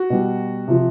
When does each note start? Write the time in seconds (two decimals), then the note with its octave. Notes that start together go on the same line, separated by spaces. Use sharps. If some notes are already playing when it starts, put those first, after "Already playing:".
Already playing: F#4
0.10 B2 G3
0.68 C3 F3